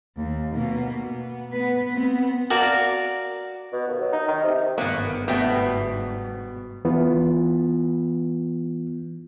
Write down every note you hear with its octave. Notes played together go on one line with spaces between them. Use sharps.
D#2
B2 A#3
B3
B3 B4
B3 C4
F#4 A#4 D5 F5
B2
D#2
F#3
D#4
D#3
C3
G1 G#2 D#3 A#3 B3
B2 A3 B3 G5
E3 B3 F4